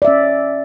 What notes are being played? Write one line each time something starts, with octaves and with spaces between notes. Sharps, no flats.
C#4 D5 E5